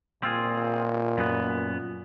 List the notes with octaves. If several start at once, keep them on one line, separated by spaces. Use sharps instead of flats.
A#2 C4 F4 G#4
F#2 B3